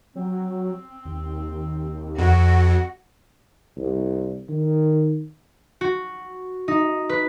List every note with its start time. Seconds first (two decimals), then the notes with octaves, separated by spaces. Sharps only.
0.16 F#3 C4
1.05 D#2
2.19 F2 F#4 F#5
3.77 C2
4.49 D#3
5.81 F#4
6.68 D#4
7.09 B4